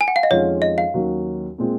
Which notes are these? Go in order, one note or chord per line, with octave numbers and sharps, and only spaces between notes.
G#5
F#5
F5
D#5
F2 D#3 G#3 C#4 F4 C#5
D#5
F5
D#2 D#3 F#3 C#4 F#4
A#2 G#3 C4 F4